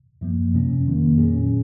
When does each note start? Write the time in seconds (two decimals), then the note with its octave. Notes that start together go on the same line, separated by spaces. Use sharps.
0.21 F#2 F3 A#3
0.54 F2 C3 F#3 C#4
0.86 F2 D#3 A#3
1.18 A#2 F#3 C#4 G#4